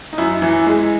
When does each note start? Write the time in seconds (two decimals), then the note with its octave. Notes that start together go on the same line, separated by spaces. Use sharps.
0.13 D#4
0.18 F#2 E4
0.42 E3
0.67 G#3